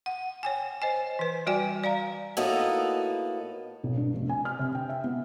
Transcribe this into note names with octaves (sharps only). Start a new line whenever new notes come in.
F#5
C#5 G5 G#5
C5 D#5 G#5
E3 B4
G3 F#4 D5 G5 G#5
D5 F5 A#5
A2 A#3 B3 D#4 F#4 A4
B1
G2
F1
G#5
F6
C3
G5
E5
B3